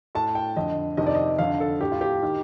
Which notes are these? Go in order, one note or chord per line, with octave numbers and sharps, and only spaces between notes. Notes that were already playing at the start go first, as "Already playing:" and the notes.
A2 A5
G5
F2 D3 D#5
F2 C3 D#3 D#5
D5
D#5
F2 D3 F5
A4
A2 G4
F4
G4
D#3